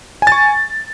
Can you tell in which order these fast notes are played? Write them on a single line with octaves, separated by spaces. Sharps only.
G#5 A6 C#6